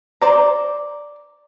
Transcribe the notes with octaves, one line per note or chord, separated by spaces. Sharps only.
C5 D5 A#5